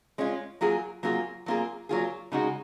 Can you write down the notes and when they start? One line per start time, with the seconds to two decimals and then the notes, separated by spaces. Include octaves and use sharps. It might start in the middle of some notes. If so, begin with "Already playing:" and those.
0.18 G#3 C#4 F4
0.61 F#3 A#3 F4 G#4
1.03 F#3 A#3 F4 G#4
1.46 F#3 A#3 F4 G#4
1.89 F#3 A#3 F4 G#4
2.32 C#3 G#3 D#4 F#4